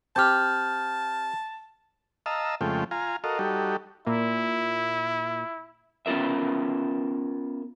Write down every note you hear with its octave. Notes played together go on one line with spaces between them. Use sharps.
C4 G4 A5 F6 G6
D#5 F5 A5 A#5 E6
F2 C#3 G#3 A3 F4 G5
F4 F5 G#5 A#5
F#4 A4 A#4 D#5 F5
G3 D#4 F#4 G4 A4
A#2 E4
B3 C#4 F4 A#4 E5